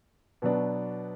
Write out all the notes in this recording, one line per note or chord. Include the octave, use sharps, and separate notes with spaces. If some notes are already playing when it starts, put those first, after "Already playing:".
B2 F#3 B3 D4